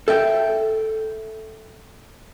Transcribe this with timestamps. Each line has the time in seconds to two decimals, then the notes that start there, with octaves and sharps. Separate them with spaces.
0.08 A4 E5 G5